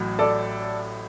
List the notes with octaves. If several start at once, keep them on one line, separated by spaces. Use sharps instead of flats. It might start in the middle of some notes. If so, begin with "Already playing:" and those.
Already playing: A1 A2 F#3
A4 D5